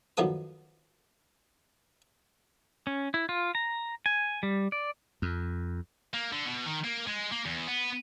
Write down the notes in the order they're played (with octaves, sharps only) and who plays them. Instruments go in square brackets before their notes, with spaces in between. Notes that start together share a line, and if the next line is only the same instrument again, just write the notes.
[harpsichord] F#2 D#3 F3 B3 A4 D#6
[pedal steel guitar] C#4
E4
F4
A#5
G#5
G3
D5
[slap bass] F2
[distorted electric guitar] A#3
D3
B2
D#3
A#3
G#3
A#3
E2
B3